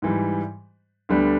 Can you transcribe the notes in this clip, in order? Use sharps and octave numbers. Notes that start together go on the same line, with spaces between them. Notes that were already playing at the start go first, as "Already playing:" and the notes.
G#2 E3 G3
D2 D3 G3 B3 D4